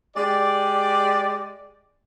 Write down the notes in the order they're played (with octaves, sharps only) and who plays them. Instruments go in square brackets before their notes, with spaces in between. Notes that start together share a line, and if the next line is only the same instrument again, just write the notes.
[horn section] G#3 G4 D5